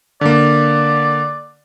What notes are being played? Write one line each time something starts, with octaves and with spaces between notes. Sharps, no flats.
D3 A#3 D5